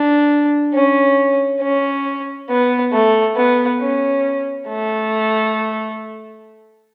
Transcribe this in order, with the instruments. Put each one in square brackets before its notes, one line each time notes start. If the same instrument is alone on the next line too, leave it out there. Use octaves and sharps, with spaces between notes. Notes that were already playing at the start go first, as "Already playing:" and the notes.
Already playing: [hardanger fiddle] D4
C#4
C#4
B3
A3
B3
C#4
A3